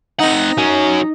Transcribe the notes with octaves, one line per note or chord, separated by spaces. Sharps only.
C4 D#4 F#5
F#3 C#4